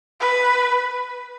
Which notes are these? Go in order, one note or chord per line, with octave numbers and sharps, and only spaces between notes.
B4